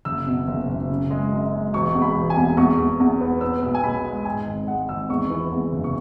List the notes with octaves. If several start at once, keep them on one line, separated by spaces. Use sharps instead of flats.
F#1 E6
B2
F#1
F#1
C#3
G#3
F#2
G#3
E1 C#6
E2
B5
E1
G#5
E2
E2 C#6
E2
E2
B3
B3 E6
B1
G#5
B1 B5
G#3
G#2 G#5
G#1
G#3 F#5
G#1 E6
E2 C#6
E3
E2
F#1
C#6